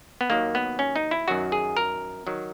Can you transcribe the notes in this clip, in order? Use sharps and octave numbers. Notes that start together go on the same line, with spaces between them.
B3
D#2 D#3 F#3 A#3
B3
C#4
D#4
E4
F#2 D#3 F#3 F#4
G#4
A#4
D#3 F#3